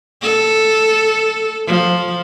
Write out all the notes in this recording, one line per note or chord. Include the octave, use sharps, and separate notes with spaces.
A4
F3